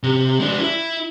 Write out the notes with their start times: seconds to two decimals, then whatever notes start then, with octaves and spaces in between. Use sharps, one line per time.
0.03 C3
0.39 G#3 D4
0.60 E4